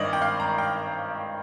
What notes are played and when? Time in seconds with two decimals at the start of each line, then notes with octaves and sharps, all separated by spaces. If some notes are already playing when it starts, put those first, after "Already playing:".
Already playing: G#1 G2 D#3 D5 D#5
0.13 G5
0.22 F5
0.40 A#5
0.58 G5